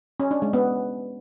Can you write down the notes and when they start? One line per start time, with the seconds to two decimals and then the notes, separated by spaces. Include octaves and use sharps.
0.20 C#4
0.31 D4
0.42 G#3
0.53 B3